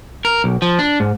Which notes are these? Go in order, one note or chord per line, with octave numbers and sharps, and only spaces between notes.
A#4
B1
F3
D4
G#2